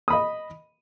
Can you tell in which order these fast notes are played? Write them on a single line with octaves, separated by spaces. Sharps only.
D#6 B5 D#5